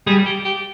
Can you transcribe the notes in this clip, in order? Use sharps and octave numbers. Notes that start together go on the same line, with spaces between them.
G3 G#4
G4
G4